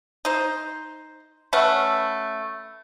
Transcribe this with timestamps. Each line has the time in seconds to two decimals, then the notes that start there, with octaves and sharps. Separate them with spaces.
0.25 D#4 C5
1.53 A3 C#4 B4 F#5